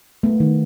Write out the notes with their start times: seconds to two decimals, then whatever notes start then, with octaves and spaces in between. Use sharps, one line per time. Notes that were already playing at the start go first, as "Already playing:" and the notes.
0.23 A3 B3
0.40 D#3